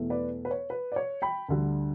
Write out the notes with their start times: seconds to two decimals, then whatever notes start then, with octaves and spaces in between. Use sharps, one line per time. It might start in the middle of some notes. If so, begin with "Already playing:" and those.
Already playing: E2 B2 A3
0.10 B4 D5
0.45 B4
0.51 C#5
0.70 B4
0.92 D5
0.96 C#5
1.22 G5 B5
1.48 D2 D3 G3